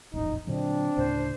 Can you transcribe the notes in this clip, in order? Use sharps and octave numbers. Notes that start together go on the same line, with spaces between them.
D#1 A1 F2 D#4
A#2 D3 F#3 C4 D4
D2 A2 C#3 C5